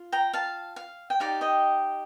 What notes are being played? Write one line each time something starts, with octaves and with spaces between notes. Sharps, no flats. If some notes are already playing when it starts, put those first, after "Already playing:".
Already playing: F4
G5 A#5
F5 A5
F5
G5
D#4 G4 D5 F5
D#5 G5